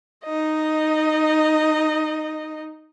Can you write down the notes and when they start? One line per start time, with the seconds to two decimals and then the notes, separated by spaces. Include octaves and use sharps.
0.25 D#4 D#5